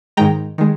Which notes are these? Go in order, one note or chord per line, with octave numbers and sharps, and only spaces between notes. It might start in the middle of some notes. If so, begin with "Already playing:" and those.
G#2 D#3 G#3 G5 A#5
D#3 G#3